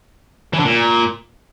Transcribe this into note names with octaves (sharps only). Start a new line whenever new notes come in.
E3
D3
A#2